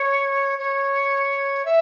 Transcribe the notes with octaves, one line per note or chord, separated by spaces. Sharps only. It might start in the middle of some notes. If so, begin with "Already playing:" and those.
Already playing: C#5
C#5
E5